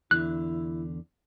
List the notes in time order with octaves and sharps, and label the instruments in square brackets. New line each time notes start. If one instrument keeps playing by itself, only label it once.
[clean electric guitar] E2 D3 [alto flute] E4 [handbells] F#6